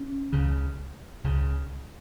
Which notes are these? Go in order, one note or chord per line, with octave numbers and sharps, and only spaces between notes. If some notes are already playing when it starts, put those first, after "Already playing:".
Already playing: C#4
C#2 C#3
C#2 C#3